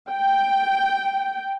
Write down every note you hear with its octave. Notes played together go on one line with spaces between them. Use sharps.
G5